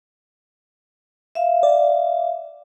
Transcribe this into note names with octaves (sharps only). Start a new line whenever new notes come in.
E5 F5
D5